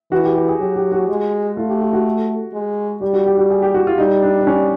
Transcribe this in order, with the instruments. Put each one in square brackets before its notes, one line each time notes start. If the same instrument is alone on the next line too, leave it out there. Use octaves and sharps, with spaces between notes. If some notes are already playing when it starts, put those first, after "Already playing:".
[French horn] E3 [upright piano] F#4
[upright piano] G4
G4
G#4
[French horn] F#3 [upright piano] G4
[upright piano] G4
F#4
[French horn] G#3
[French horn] A3 [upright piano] F4
[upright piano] G4
G4
F#4
[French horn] G#3
[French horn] G3 [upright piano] G4
[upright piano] F#4
G4
F#4
G#4
G4
F#4
F4
[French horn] G3 [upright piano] D#4
[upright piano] D4
D4
C#4